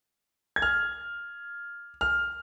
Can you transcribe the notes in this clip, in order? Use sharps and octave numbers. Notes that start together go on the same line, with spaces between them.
G#6
F6
F6